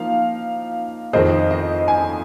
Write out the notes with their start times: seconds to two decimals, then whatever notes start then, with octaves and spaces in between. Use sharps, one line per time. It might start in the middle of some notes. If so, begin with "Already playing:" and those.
Already playing: F3 A#3 D#4 F5
1.13 F2 D#3 C4 G#4 C5 D#5
1.51 D#5
1.88 G#5